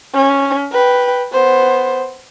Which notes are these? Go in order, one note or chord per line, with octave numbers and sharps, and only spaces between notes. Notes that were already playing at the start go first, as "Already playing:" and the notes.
C#4
B4 G5
B3 C5